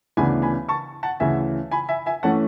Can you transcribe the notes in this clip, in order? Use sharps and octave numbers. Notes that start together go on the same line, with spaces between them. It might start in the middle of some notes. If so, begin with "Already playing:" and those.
D2 C#3 E3 B3 D4 G#5 B5
G#5 B5
A5 C#6
F#5 A5
D2 C#3 E3 E5 G#5
G#5 B5
E5 G#5
E5 G#5
E3 A3 C#4 F#5 A5